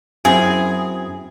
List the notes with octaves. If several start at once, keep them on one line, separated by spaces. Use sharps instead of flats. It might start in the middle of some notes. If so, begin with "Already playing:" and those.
F#2 C4 E4 G#4